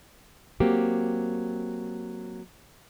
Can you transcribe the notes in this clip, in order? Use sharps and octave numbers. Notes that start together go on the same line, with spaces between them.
F#3 A#3 C4 G4